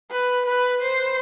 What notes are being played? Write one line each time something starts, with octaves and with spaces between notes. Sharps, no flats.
B4
B4
C5